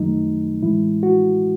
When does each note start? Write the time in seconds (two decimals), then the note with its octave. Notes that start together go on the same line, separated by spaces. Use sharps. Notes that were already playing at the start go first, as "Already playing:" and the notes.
Already playing: F#2 D#3 F#3 A3 D#4
0.62 A2 E3 G#3 E4
1.03 F#4